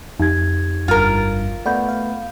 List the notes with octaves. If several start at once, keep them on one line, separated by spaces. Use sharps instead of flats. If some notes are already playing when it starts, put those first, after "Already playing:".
F2 D#4 G4 G#6
G1 G2 F4 A#4
A3 B3 D5 F#5 B5 G6
F5